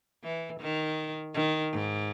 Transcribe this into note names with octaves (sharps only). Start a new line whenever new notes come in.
E3
D#3
D#3
G#2